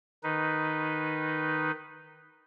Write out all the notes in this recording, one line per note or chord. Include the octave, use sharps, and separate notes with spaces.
D#3 D#4 B4